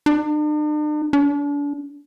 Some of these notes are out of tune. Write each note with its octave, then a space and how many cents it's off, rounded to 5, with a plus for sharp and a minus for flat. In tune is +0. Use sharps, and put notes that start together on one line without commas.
D4 +45
D4 -35